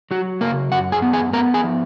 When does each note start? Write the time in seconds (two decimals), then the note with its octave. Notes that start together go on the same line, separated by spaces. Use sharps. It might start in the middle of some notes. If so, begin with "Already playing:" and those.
0.11 F#3 F#4
0.41 C#3 A#3 A#4
0.72 F#2 F#4 F#5
0.92 G#4 G#5
1.02 B3
1.13 G#4 G#5
1.33 B3 A#4 A#5
1.54 G#4 G#5
1.64 F3